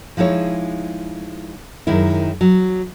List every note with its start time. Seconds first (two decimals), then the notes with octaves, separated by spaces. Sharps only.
0.17 F3 G#3 D#4 E4 C#5
1.87 F#2 D#3 G#3 E4
2.41 F#3